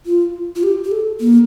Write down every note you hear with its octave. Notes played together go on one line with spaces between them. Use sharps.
F4
F4
G4
G4
A4
A#3